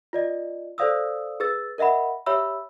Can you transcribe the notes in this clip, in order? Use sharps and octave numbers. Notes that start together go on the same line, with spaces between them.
F4 D5 D#5
A4 C5 D5 F5 D#6 E6
G#4 B4 E6 A6
A#4 D#5 E5 F#5 B5
G4 C#5 E5 B5 E6